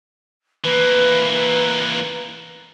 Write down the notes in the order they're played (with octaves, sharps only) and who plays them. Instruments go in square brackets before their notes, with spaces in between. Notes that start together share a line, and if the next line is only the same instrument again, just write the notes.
[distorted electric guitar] E3 A#3 [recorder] B4